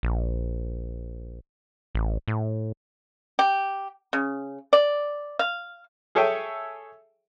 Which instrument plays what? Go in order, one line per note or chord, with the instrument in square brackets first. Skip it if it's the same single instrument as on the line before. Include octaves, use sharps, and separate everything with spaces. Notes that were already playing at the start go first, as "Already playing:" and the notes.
[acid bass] A#1
A1
A2
[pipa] G4
C#3
D5
F5
[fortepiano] G#4 A4 C#5 E5 G5 G#5